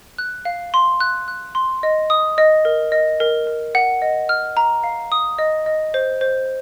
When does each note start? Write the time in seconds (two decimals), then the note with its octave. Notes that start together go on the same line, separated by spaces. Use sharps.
0.18 F#6
0.45 F5
0.74 C6
1.00 F#6
1.28 F#6
1.55 C6
1.83 D#5
2.10 D#6
2.38 D#5
2.65 A#4
2.92 D#5
3.20 A#4
3.47 A#4
3.75 F#5
4.02 D#5
4.29 F6
4.57 A#5
4.84 F5
5.12 D#6
5.39 D#5
5.66 D#5
5.94 C5
6.21 C5